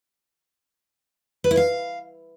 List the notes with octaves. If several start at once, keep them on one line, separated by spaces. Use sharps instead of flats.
B4
E4
F5